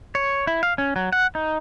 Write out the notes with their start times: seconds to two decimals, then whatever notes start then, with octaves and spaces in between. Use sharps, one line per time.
0.15 C#5
0.47 E4
0.63 F5
0.78 C#4
0.96 F#3
1.13 F#5
1.35 D#4